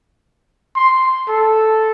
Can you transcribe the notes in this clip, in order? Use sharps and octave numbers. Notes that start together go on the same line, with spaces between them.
C6
A4